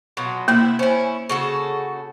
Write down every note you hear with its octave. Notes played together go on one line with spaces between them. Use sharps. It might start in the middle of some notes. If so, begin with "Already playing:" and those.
B2 F#3 F4
C3 A#3 E4
C#4 E4 C5 G#5
C#3 F#4 A4